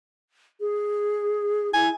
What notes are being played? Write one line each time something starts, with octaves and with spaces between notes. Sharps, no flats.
G#4
E4 G#5